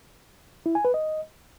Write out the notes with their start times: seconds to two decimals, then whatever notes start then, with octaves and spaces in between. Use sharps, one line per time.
0.66 E4
0.75 G#5
0.85 B4
0.94 D#5